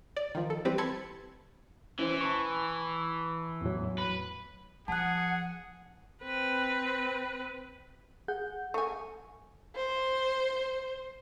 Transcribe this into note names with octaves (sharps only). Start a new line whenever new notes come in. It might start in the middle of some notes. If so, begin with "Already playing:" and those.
D5
D#3 F3
A4
E3 G3 C4 G4 B4
A5 B5 C6 E6 G#6 C#7
E3 C#4 E4 C5
A5 B5 C#6
E2 A2 F#3
B4
F3 G#4 F#5 A5 F#6
C4 B4
G#4 F#5 G6
A3 G#5 C#6
C5